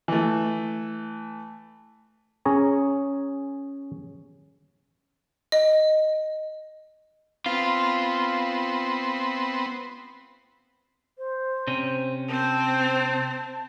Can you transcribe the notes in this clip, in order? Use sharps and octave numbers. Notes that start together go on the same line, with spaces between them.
E3 A3
C#4 G#4 C#5 A#5
D#5
B3 C4 F4
C5
C3 C#4
C4 C5 A5
A5